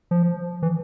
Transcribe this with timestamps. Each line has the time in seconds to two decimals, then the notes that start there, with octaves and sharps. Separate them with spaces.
0.11 F3
0.62 E3